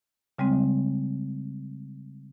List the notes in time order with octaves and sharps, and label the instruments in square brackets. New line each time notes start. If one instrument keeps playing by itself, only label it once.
[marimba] C#3 G3 G#3 C4